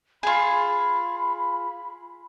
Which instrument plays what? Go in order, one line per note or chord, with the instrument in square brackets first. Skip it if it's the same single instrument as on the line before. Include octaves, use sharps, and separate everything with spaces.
[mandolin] F4 G#4 [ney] B5